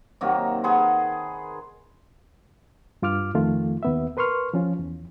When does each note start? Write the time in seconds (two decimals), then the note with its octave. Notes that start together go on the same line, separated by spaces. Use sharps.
0.21 C3 D#3 F#3 A#3
0.64 G#4 B4 F#5 C6
3.02 G2 F4 D6 F6
3.34 F2 D#3 A3 F4
3.83 D#2 B3 E5
4.17 A#4 B4 C6 C#6 F6
4.53 F3 C#4 F4
4.79 E2